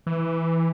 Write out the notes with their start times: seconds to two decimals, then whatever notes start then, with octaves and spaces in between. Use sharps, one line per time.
0.07 E3